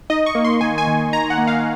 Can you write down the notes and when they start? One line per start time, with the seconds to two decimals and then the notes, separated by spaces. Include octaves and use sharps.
0.10 D#4 D#5
0.26 C#6
0.35 A#3
0.44 C6
0.61 D#3 G#5
0.78 G#5
0.87 D#3
1.13 D#4 A#5
1.30 F#5
1.38 A#3
1.47 F5